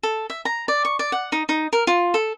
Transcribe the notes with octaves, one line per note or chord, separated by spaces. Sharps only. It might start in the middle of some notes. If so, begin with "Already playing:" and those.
A4
E5
A#5
D5
C#6
D5
F#5
D#4
D#4
A#4
F4
A4